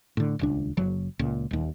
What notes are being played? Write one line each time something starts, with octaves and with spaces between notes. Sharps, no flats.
A2 D3
D#1 C#2 D4
F#1 F#3
C#2 A#2
D#1 D#2